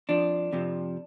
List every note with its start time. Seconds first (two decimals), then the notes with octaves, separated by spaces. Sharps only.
0.09 F2 F3 D4
0.52 F2 C3 F3